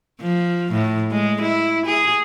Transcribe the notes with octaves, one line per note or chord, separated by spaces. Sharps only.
F3
A2
G#3
E4
G#4